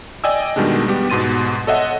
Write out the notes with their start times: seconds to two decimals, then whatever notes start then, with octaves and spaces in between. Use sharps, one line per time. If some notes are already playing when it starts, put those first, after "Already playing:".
0.24 D5 D#5 G5 G#5 E6
0.56 B2 D#3 G3 G#3 D4
0.88 G3 B3 G4
1.10 G#2 B2 C6 A6 D#7
1.67 A4 C#5 D#5 E5 F#5